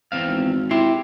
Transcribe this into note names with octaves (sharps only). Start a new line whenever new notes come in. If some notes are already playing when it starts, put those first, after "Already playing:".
E2 C4 F5
G#1
E4 G4 C6